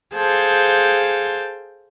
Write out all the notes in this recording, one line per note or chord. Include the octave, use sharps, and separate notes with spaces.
G#4 A4 C5 F5 G5